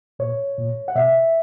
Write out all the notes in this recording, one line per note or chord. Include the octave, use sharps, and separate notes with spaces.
A#2 C#5
A#2
F#5
B2 E5